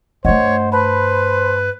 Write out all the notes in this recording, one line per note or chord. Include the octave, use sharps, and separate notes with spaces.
G2 A3 C5 C#5 D#5 F#5
B4 C5 A5 B5